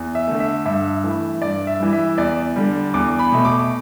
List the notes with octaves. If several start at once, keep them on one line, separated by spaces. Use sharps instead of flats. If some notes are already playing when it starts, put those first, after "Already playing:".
Already playing: E2
E5
D3 A3
E5
G2 E5
E3 A3
G2 D5
E5
E3 G3
E5
E2 D5
D3 G3
E2 D6
B5
B2 A3
D6